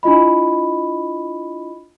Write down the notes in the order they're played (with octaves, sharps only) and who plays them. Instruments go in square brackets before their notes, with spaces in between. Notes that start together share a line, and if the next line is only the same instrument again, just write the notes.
[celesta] D4 E4 F4 D#5 B5